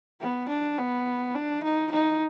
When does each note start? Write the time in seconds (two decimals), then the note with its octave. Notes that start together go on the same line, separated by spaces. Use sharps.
0.20 B3
0.49 D4
0.78 B3
1.35 D4
1.63 D#4
1.91 D#4